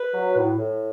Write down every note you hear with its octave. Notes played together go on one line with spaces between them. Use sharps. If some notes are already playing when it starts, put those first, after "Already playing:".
Already playing: B4
F#3
A2
A2